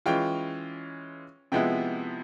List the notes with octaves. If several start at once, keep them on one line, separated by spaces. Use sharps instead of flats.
E3 G#3 C#4 F4 G5
C3 F3 G#3 B3 E4 G5